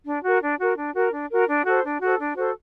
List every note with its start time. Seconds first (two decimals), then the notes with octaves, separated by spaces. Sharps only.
0.06 D4
0.24 F#4 A#4
0.42 D4
0.58 F#4 A#4
0.77 D4
0.95 F#4 A#4
1.13 D4
1.31 F#4 A#4
1.48 D4
1.65 F#4 A4 C5
1.84 D4
2.00 F#4 A4 C5
2.19 D4
2.36 F#4 A4 C5